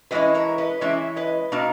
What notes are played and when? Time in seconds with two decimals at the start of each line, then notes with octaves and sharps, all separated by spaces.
0.11 E3 G#3 C#4 E4 B4 D#5
0.34 A#4 C#5
0.58 B4 D#5
0.81 E3 G#3 C#4 E4 C#5 E5
1.16 B4 D#5
1.52 B2 A#3 D#4